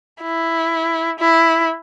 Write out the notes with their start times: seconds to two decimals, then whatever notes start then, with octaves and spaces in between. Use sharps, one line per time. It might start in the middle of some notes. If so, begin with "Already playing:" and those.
0.22 E4
1.20 E4